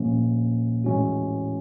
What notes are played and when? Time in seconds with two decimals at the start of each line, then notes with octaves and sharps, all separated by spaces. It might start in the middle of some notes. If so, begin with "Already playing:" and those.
Already playing: A#2 F3 A#3 C#4
0.84 A2 E3 G#3 C#4 F#4